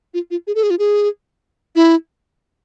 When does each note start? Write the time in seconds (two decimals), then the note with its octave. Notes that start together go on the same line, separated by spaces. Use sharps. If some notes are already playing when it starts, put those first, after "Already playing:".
0.14 F4
0.31 F4
0.47 G#4
0.55 A4
0.63 G#4
0.70 F4
0.79 G#4
1.76 E4